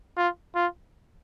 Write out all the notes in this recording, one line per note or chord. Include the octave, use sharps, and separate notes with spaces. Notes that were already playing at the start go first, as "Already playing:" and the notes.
F4
F4